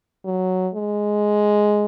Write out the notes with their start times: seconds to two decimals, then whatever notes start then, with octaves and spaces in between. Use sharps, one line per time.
0.25 F#3
0.75 G#3